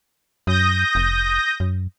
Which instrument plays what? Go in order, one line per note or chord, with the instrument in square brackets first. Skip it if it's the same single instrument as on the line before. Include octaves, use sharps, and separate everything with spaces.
[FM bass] F#2 [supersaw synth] D#6 G6 A#6
[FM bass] F1
F#2